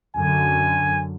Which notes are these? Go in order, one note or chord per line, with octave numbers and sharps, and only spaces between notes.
F#2 D3 G#5